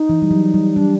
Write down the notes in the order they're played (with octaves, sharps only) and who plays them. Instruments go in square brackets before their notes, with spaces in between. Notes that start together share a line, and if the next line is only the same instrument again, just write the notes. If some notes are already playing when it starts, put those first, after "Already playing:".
Already playing: [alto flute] D#4
[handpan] E3
G3
F#3
G3
[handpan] G3 [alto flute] D4